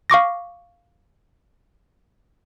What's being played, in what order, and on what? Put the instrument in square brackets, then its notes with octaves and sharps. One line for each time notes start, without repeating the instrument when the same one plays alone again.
[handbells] F5 C#6 D6 A#6